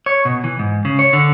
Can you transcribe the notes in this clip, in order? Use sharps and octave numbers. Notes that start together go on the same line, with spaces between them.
C#5
B2
E3
G#2
C#3
C#5
D3